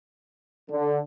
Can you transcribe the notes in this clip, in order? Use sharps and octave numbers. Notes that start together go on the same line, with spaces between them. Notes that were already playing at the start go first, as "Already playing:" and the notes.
D3